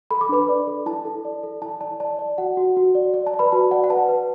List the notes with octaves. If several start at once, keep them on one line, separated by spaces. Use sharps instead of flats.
A4 B5
D6
D4 B4 B5
D5
A4
E4 A5
A4
D5
A4
E4 A5
D5 A5
D5 A5
D5
F#4 F#5
F#4
F#4
D5
D5
A5
D5
B4 B5
F#4 A5
D5 F#5
F#5
B4 A5
B4